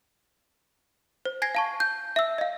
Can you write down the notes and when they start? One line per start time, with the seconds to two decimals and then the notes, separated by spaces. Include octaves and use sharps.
1.26 C5
1.42 G#5 G#6 A#6 C7
1.55 F5 A5 C#6
1.80 G6
2.16 E5 E6
2.38 D#5 F5